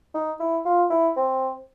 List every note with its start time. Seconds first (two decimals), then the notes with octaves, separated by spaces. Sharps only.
0.14 D#4
0.40 E4
0.65 F4
0.90 E4
1.16 C4